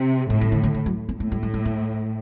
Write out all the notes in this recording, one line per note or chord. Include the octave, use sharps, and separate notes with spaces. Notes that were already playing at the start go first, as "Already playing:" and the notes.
Already playing: C3
A2 A3
G3
D3
D3
D3
F#3
C4
A2 A3
G3
G3
G3
A3